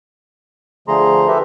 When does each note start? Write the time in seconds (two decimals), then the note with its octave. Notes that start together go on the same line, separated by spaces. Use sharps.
0.88 D3 F3 A3 G#4 A#5 C6
1.28 G4 A4 B4 E5